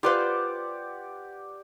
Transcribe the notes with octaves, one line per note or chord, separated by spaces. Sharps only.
F4 G4 B4 C5 D5 F#5